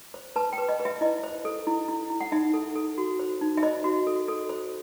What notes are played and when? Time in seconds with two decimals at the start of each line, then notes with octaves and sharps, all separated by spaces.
0.14 C5
0.36 B4 A5
0.53 G5
0.58 B4
0.69 D#5
0.80 B4
0.85 E5
1.01 E4 D#5
1.24 C5
1.45 A4
1.67 E4
1.88 E4
2.10 E4
2.21 F#5
2.32 D#4 E5
2.54 A4
2.75 A4
2.98 F#4
3.19 C5
3.41 D#4
3.57 E5
3.63 C5 D#5
3.84 F#4
4.07 A4
4.28 A4
4.49 C5